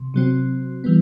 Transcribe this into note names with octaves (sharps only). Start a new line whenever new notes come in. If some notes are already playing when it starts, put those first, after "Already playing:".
Already playing: C3
C3 F#3 C4
E3 G3 B3